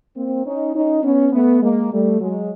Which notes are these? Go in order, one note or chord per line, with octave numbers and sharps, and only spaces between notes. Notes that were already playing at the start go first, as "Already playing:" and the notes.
A#3 C4
C#4 D#4
C#4 D#4
B3 C#4
A3 B3
G#3 A#3
G3 A3
F#3 G#3